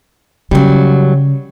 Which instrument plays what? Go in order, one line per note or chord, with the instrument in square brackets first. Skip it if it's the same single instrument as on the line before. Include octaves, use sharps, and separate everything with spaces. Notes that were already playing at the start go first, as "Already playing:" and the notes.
[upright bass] C#3 [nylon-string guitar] F#3 G3